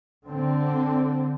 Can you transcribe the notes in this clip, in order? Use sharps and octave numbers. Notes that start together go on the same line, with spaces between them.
D3 C4